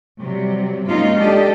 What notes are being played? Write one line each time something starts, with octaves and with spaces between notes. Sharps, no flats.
C3 F#3 G3
F#3 G#3 A#3 C#4 D#4 F4
D4 G4 A4 D#5